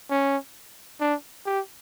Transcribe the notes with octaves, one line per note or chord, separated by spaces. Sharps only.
C#4
D4
G4